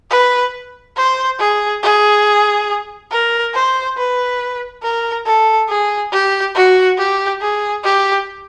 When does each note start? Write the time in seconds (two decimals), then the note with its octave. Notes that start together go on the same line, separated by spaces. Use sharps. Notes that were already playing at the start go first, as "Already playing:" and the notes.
0.10 B4
0.97 C5
1.39 G#4
1.83 G#4
3.11 A#4
3.54 C5
3.97 B4
4.83 A#4
5.26 A4
5.69 G#4
6.12 G4
6.55 F#4
6.98 G4
7.41 G#4
7.84 G4